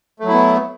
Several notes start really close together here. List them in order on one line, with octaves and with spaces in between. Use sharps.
A3 F#3 E4 B3